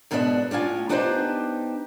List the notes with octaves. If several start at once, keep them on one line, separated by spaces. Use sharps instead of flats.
G#2 B2 B3 D4 G#4 E5
A2 D4 F4 G#5
B3 D4 D#4 G4 B4 C5